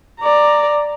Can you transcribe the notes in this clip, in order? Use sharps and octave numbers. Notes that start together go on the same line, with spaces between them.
D5 A#5